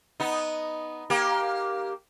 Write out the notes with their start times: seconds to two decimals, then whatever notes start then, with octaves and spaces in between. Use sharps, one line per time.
0.20 B3 D#4
1.10 A#3 G4